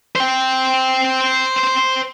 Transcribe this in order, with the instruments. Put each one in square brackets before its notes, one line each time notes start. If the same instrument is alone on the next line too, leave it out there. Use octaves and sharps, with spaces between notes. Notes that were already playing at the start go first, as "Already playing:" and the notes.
[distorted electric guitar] C5 G5